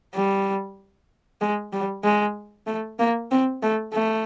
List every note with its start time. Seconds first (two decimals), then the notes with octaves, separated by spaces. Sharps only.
0.15 G3
1.41 G#3
1.73 G3
2.04 G#3
2.67 A3
3.00 A#3
3.31 C4
3.62 A3
3.94 A3